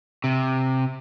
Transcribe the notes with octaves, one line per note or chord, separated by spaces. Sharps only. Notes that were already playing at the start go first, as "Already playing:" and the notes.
C3